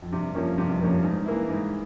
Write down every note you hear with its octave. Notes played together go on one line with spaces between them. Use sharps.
F2
G2 C3
F2 F3 A#3 C#4
G2 C3
F2
G2 F3 A#3 C#4
G2
G#2
E3 A#3 E4
G#2